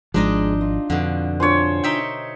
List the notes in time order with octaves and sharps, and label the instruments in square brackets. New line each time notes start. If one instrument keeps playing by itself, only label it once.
[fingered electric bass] G#1 F3 [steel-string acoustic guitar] G#3 [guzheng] D4 D#4 D#5
[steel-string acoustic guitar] F4
[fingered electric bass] F2 [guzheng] B2 D3
[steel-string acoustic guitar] D4 F4 G#5 [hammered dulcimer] C5 C#5
[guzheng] D#4 E5 G5